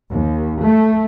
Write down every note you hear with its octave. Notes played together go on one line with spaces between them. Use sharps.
D#2
A3